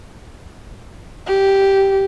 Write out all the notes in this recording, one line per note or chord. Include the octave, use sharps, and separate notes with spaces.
G4